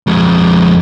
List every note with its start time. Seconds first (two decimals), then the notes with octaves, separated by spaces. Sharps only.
0.07 F2 G#3